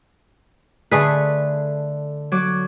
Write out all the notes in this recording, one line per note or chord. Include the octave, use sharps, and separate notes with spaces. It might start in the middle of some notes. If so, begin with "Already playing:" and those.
D3 A3 G#4 B4
F#3 D6